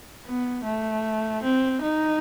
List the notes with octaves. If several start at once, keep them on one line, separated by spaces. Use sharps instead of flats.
B3
A3
C4
D#4